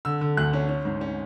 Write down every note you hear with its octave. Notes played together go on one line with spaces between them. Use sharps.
D3 E6
D3
D2 F#6
C#4
C#4
G#2
C#4